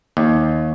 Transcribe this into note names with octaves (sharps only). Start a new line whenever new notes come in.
D#2